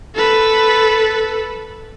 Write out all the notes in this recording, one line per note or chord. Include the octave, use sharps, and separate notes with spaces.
A4 B4